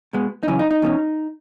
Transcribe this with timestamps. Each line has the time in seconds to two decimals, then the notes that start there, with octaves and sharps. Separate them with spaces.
0.13 B2 G#3 B3
0.43 D#4
0.47 F#2 C#3 E3 C#4
0.59 D#4
0.71 D#4
0.82 E2 B2 A3 C#4